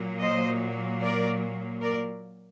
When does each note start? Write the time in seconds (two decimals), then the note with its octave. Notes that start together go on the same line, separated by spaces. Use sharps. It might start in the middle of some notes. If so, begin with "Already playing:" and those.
Already playing: A#2 F#3 A#3
0.20 C5 D#5
1.01 A#4 D5
1.82 A#4 D5